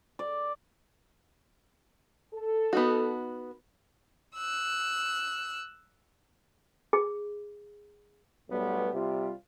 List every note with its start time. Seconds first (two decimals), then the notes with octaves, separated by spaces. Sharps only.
0.19 D5
2.34 A4
2.73 B3 D#4 F#4
4.35 E6 F#6
6.93 G#4
8.49 B1 G3 A3 B3
8.94 C3 G3 F4